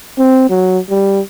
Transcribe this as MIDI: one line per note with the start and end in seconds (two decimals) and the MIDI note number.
0.18 0.48 60
0.50 0.78 54
0.90 1.20 55